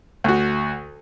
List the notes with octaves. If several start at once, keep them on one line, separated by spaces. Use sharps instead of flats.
D2 F#4